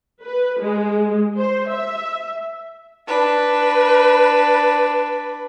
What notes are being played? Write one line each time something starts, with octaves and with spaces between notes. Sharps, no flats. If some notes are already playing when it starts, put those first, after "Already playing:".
B4
G#3
C5
E5
D4 B4